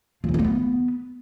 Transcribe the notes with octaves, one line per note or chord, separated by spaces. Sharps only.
F4
E3
D#4
A#3
B3